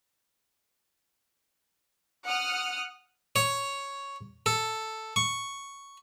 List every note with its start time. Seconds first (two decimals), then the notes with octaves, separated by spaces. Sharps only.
2.26 F#5 D#6 F6
3.36 C#5
4.46 A4
5.16 C#6